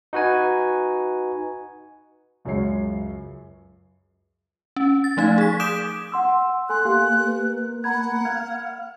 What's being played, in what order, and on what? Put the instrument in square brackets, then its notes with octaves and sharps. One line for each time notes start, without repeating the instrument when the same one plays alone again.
[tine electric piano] D#4 F#4 B4 G#5
[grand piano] C#2 F#2 F#3 G#3 C#5 C7
[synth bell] C#4
A6
F3 A3 D#4 F5 G#6
G#4 B6
D6 D#6 G6 D7 E7
[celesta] F#5 C6 E6
[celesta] A4 G#5 C6 [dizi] F#6
[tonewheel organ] A#3 [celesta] G4 F5
[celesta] B4
[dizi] F#5 [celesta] A#5 B5 G#6
[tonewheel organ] F5 [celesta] G#6